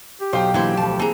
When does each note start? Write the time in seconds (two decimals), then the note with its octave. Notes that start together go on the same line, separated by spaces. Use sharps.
0.21 G4
0.33 B1 C5 D#5 F5 G5
0.54 D3 E3 F#3 A#3 E4 G4 C5
0.77 D2 D#3 F3 A5
0.99 E3 A#3 C4 G#4 A#5